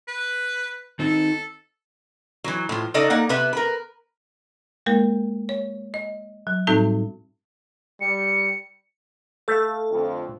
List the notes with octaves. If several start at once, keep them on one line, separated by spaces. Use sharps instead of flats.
B4
D#3 C4 D#4 A4
E3 F#3
A2 F3
C#3 D#4 A4 D5 D#5
A#3 D#4 F#5
C3 B3 B4 E5
A#4 B4
G#3 A#3 A#4
C#5
D#5
F#3
A2 G3 C4 D#4 F#4 A4
G3 C#7
A3 A4 F5
F2 D3 C4